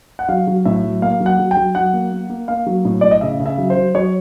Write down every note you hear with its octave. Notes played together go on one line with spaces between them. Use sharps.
F#5
F#3 F5
F#3
A2 E5
F#3
A#3 F5
F#3
F#5
F#3
G5
F#3
F#3 F#5
A#3
A#3
A#3
A#3 F5
F#3
A2
A2 D5
D#5
C#3 E5
C#3
E5
F#3
C5
F#3
F#3 C#5